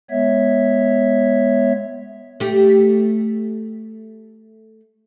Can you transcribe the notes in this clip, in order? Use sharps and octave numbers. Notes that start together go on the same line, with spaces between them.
G#3 B3 C#5 E5
A3 G4